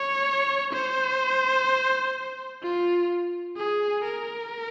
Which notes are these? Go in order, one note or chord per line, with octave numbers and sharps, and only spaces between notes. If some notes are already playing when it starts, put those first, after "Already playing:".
Already playing: C#5
C5
F4
G#4
A#4